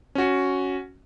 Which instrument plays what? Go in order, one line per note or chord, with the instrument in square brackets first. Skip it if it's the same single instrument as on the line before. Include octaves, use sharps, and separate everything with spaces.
[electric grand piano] C#4 F#4